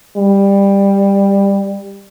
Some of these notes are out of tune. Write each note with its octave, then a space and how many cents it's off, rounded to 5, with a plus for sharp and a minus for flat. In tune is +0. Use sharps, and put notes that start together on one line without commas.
G3 +15